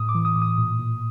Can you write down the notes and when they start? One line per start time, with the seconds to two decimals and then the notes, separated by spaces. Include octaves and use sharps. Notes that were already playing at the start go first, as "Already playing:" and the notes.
Already playing: A2 D#6
0.09 D6
0.15 E3
0.25 D#6
0.36 A2
0.42 D#6
0.58 A#2
0.79 A#2